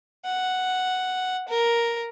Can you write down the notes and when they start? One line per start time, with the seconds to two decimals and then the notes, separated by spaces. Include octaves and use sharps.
0.25 F#5
1.48 A#4